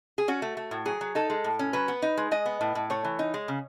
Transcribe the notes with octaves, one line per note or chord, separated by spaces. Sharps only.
G#4
C#4 F#4
A3
A3
A2
F#3 G#4
F#3
D#4 A4
G#3
A2
C#4
F#3 B4
B3
D#4
G#3
G#3 D#5
B3
A2
A2
A3 C#5
E3
D#4
G#3
C#3